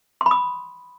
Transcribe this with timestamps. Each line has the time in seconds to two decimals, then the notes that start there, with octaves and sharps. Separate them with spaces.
0.21 C6
0.26 B5
0.31 D#6